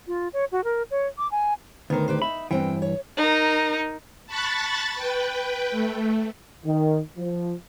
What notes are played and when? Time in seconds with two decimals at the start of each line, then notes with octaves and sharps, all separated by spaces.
0.07 F4
0.33 C#5
0.52 F#4
0.64 A#4
0.91 C#5
1.18 D6
1.32 G#5
1.90 D2 D#3 B3 A#4 C5
2.08 G4 B4 C5
2.22 D#4 E5 B5
2.51 E2 G2 E3 C4 G5
2.82 C#5
3.17 D#4 A#4
4.26 A5 B5 C#6 F#6 A6
4.95 B4 G5
5.71 A3
6.65 D#3
7.17 F3